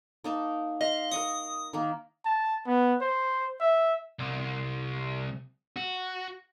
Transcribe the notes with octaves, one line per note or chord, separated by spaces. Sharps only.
A#3 D#4 A5
D#5 F5 C6
A#4 D#5 C#6 D#6
D#3 A#3
A5
B3
C5
E5
C2
F#4